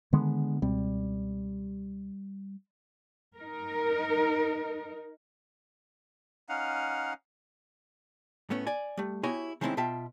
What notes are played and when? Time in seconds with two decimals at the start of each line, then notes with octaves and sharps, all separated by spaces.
0.13 D3 D#3 G#3 B3
0.62 C#2 B2 G3 C4
3.37 D#4 A#4
6.49 C#4 D#4 F5 F#5
8.50 A2 A3 B3 C#4
8.67 D5 G#5
8.97 G3 A3
9.23 B3 E4 F#4 G4 C#5 G#5
9.61 D#3 G#3 A3 C4 C#4 E4
9.77 B2 F4 E5 G5 A5